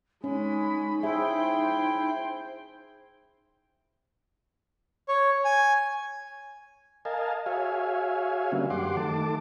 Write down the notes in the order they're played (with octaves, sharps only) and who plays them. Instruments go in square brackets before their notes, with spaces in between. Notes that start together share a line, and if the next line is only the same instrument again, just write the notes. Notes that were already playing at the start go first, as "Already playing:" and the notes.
[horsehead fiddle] G#3 B5 [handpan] C#4 [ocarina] D#4
[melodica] E4 [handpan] G#4 E5 [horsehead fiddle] C5 G5
[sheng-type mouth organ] C#5
G#5
[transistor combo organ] A#4 D#5 F5 G#5 A5
F#4 G#4 C#5 E5 F5 G#5
D3 G3 A#3 B3 C#4 F#4
F#2 G4 F#5 C6 D6
D#3 A3 A5 D6